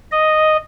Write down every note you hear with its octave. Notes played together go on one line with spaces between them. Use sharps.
D#5